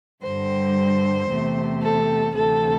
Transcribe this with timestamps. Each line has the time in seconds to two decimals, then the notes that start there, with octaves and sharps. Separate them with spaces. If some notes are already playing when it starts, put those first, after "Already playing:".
0.23 G2 D3 G3 C5
1.28 E2 C3 A3
1.82 A4
2.35 D2 C3 E3 A4